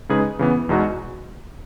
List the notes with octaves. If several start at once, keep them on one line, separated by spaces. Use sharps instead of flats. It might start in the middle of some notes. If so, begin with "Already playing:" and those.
C#3 G#3 D#4 G#4 B4
C#3 E3 B3
E2 B2 G#3 D#4 F#4